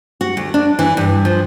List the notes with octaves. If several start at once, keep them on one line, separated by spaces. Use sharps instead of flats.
F#4
D2
D4
E3
G2
F3